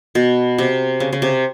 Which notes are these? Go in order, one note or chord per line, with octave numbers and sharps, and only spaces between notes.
B2
C3
C#3
C#3
C3